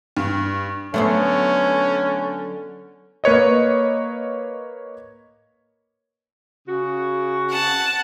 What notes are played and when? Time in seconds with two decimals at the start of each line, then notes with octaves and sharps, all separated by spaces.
0.17 G2
0.94 D3 F#3 A3 B3 C#4 C5
3.24 A#3 B4 C#5 D#5
6.69 C#3 F#4
7.50 F#5 A5